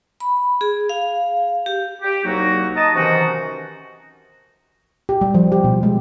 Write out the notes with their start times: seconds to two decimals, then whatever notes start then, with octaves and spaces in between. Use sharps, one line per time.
0.20 B5
0.61 G#4
0.89 F5
1.66 G4
2.02 G4
2.24 C2 F#3 A#3 D#4 F#4
2.77 D#5 A5 A#5 D#6
2.94 C3 D#3 E3 C#4 D#4 F#4
5.09 G4
5.21 G3
5.34 F3
5.52 G4
5.64 B2
5.83 G#3